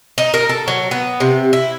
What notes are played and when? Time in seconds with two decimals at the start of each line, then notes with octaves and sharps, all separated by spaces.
0.18 D#4
0.34 A#4
0.49 A4
0.68 F#3
0.91 B3
1.20 C3
1.53 E4